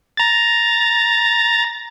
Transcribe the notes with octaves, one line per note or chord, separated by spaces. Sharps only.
A#5 A6